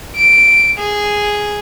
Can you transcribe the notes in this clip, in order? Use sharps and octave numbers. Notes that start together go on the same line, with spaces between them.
D7
G#4